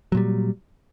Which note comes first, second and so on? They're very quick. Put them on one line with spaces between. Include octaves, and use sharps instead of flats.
F#3 A#2 G3